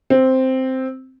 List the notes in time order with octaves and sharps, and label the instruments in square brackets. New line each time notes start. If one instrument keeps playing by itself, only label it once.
[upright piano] C4